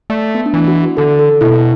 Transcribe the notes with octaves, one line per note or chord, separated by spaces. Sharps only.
A3 D5
B3
D4
E3 E4
F#4
D3 A4
A4
B2 E4